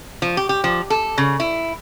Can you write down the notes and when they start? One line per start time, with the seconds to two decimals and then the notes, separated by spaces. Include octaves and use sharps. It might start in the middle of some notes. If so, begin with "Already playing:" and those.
0.22 F3
0.37 G4
0.49 G4
0.64 F3
0.90 A4
1.18 C#3
1.40 E4